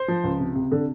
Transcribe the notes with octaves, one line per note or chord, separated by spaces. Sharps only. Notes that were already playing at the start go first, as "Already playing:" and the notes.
Already playing: C5
F3
C#2
C3
C3
D3